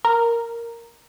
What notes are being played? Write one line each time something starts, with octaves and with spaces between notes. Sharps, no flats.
A#4